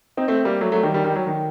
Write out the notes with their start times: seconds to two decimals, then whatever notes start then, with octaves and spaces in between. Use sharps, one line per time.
0.17 C4 D#4
0.28 A3 C4
0.45 G3 A#3
0.61 F#3 A3
0.72 F#3 A3
0.83 D#3 G3
0.94 D#3 G3
1.04 D#3 G3
1.16 F#3
1.27 D#3